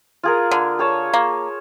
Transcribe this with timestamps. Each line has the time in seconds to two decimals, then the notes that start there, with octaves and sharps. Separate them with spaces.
0.23 F4 G#4 A#4
0.51 D3
0.79 G#4 C#5 A5
1.14 A#3